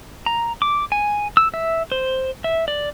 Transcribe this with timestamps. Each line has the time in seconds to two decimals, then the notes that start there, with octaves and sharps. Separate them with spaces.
0.26 A#5
0.62 D6
0.92 G#5
1.37 E6
1.54 E5
1.92 C5
2.44 E5
2.68 D5